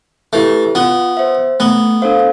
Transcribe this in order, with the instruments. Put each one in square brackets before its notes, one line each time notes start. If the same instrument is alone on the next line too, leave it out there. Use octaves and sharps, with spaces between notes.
[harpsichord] A3 [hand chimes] E4 G4 B4
[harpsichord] B3 [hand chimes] F4
[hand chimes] C5 E5
[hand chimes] A3 [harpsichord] B3
[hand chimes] D4 A4 C5 F5